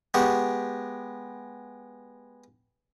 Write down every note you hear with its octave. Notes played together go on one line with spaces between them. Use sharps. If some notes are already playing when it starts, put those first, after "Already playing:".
G#3 B3 G4 C#6